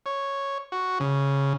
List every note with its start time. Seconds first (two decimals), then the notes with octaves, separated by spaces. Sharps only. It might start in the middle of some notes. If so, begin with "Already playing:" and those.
0.06 C#5
0.72 F#4
1.00 C#3